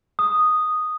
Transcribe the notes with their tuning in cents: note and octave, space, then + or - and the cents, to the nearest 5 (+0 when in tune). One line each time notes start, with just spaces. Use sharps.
D#6 -5